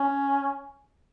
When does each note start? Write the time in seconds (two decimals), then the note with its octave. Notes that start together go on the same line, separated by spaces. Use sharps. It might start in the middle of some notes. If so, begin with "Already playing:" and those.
Already playing: C#4